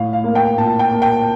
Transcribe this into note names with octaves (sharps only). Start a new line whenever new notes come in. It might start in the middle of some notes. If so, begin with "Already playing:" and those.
Already playing: A2 F5
F5
A#3
G5
A#2 A5
G5
A#3
G5